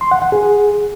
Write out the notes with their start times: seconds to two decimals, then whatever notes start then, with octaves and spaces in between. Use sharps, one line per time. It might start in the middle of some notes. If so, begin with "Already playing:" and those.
0.01 C6
0.11 F#5
0.22 F#5
0.32 G#4